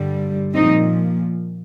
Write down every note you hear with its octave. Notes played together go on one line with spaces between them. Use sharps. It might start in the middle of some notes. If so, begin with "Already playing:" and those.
Already playing: G2 D3 G3
A#2 F3 C4 D#4